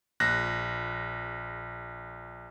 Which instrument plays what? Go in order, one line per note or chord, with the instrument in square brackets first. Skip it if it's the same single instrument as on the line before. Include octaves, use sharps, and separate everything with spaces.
[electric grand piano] A#1 F#6 A#6